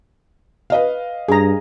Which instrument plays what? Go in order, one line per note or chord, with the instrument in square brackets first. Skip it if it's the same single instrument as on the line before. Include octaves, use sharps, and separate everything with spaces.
[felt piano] B4 D#5 F5
[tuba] G2 [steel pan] G#4 A#5